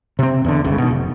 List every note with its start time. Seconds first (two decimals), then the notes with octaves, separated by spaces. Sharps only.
0.19 C3 C4
0.45 E2 D3
0.64 G1 C#2 C#3
0.78 B2 D#3
0.90 F1